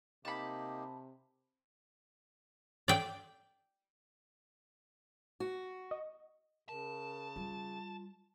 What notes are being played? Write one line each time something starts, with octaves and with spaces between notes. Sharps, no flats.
C3 A#3 D#4 G4 A5 B5
D5 G5
F#4
D#5
C#3 A#4 A5
G3 F4